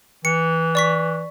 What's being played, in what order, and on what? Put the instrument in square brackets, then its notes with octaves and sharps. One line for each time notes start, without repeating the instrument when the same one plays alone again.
[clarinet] E3 [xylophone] C#7
[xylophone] D5 C#6 B6